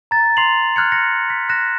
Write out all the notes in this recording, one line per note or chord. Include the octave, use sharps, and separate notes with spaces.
A#5 A6
C6 C7 F7 F#7
F6 F#6 G#6 C#7
A#6 C#7
B6
F#6 A#6 E7